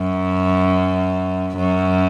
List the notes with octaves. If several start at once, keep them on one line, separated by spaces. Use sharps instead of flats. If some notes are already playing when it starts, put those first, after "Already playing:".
Already playing: F#2
F#2